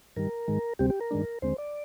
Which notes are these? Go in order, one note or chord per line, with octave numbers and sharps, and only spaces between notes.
G2 D#3 G3 A#4
G#2 D#3 G#3
D2 C3 G3 C4 G4
G4
A#4
G2 D#3 G#3 D4
D#2 D3 G#3 C4 C5
D5